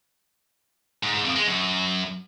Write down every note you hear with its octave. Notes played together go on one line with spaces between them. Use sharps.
G#2
G#2
F2
G#3
F#2